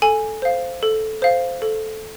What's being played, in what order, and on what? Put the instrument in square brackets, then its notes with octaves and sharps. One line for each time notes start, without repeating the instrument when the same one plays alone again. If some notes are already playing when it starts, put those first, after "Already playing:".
[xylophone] A4 G#5
C5 F5
A4
C5 F5
A4